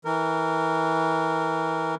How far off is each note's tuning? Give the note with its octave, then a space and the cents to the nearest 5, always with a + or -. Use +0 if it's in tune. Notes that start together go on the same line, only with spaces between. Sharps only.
E3 -25 A#4 -20